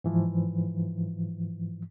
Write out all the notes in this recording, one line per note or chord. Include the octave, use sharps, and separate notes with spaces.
G#2 E3 F3